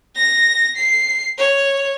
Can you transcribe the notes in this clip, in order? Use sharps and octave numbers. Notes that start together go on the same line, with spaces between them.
A#6
C7
C#5